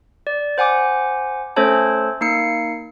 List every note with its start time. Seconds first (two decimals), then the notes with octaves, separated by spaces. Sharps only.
0.27 D5
0.58 C5 F#5 G#5 D6
1.56 A3 C#4 A4 C5 C#5 A5
2.21 A#3 D#4 C7 C#7